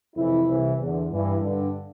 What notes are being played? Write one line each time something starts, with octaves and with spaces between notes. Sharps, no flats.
F2 C3 E3 E4
C2 C3 E3
E2 D3
G2 E3
G2 D3